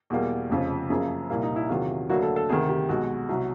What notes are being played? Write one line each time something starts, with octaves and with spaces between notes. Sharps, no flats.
E2 B2 G3 A#3
F1 F2 C#3 F3
F#2 C#3 F3 A#3 G#4
C2 A#2 G3 A#3 E4
D#4
E4
E2 C3 D#3 F#3 F4
D2 D3 F#3 A#3 F#4
A4
A4
D2 C3 D#3 G#4
G4
B1 B2 G#3 F#4
C2 B2 F#3 F#4